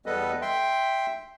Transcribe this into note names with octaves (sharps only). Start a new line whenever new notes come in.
E2 G3 B3 A4 B4 D#5
E5 G5 C6